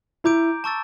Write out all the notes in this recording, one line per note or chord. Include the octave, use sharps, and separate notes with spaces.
E4 A#5 D6 G6 D7
A5 C#6 E6 A6